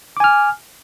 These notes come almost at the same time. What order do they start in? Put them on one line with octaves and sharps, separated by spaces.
D6 G#5 F6